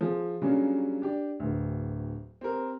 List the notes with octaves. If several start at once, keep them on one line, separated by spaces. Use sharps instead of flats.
F3 G#4
C#3 F#3 G3 A#3 C#4 D4
D4 G4 D5
D1 D2
C4 G4 A#4